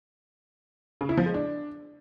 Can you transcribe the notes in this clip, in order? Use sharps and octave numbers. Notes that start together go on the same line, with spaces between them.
C#3
E4
F3
G#3
D4